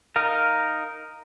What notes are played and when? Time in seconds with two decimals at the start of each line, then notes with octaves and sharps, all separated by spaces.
0.16 D#4 A#4 F5